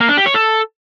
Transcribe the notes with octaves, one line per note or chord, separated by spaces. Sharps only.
A#3
D4
G4
C#5
A4